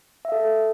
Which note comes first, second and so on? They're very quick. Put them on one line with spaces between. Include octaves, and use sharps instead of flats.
E5 F5 A4